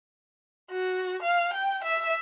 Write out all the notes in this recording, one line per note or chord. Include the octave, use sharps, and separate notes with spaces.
F#4
F5
G5
E5